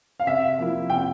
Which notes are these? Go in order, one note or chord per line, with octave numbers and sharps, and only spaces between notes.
F5
C3 E5
F3 A#3 E4
C3 G5